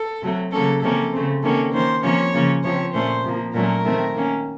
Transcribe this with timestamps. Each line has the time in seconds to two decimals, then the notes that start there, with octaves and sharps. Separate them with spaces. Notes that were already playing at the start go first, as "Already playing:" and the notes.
Already playing: A4
0.22 C3 F#3 A3
0.52 C#3 F#3 A#3 C#4 A4
0.82 C3 F3 A#3 C#4 A4
1.13 C#3 A3 C4
1.43 C3 D#3 A#3 C#4 A4
1.73 D#3 A#3 C#4 C5
2.03 C3 F3 A#3 C#4 C#5
2.33 C#3 F3 A#3 C#4
2.64 C3 F3 C4 C#5
2.93 A#2 A3 C#4 C5
3.24 C3 F3 A#3
3.54 A#2 F#3 A3 C#4 A#4
3.84 C3 D#3 A3 C4
4.14 D#3 A#3 C#4